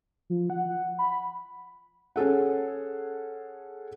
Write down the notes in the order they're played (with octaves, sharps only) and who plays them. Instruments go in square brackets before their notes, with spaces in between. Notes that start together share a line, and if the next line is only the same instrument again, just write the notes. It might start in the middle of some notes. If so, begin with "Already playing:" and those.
[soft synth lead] F3
F#5
B5
[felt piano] C#4 G#4 A4 F#5